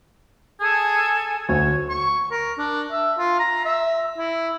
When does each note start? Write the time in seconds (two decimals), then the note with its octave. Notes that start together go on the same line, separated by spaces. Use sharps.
0.60 G#4 A4 G#5
1.49 D2 C#5
1.89 C#6
2.31 A#4
2.58 D4
2.92 E5
3.18 F4
3.39 A#5
3.65 E5
4.18 E4